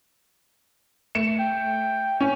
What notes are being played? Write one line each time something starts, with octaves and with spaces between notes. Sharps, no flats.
A3 C#7 E7
G5
C#4